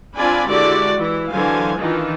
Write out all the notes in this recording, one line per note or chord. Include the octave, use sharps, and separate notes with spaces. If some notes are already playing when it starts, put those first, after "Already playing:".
C4 D4 F4 D5 G#5 B5
D3 G#3 E4 F#4 G4 D5
E3 E4
D3 E3 F#3 C5 F5 G#5
D#3 E3 D4 D#4 F4